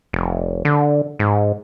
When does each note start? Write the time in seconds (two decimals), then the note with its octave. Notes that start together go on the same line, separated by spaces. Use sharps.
0.13 F1
0.65 D3
1.19 G#2